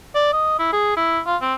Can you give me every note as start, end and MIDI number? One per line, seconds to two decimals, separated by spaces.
0.15 0.31 74
0.33 0.58 75
0.59 0.69 64
0.73 0.91 68
0.97 1.19 64
1.27 1.36 65
1.42 1.54 60